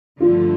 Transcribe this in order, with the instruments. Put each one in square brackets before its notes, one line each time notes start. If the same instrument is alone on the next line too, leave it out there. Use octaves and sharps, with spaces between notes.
[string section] G2 D3 F3 A3 [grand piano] F4